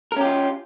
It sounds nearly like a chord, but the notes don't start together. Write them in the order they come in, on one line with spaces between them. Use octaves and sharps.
A#4 C#4 G4 F4